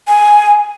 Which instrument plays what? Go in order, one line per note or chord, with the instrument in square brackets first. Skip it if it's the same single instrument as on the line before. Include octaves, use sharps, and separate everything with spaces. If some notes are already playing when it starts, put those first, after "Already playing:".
[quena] G#5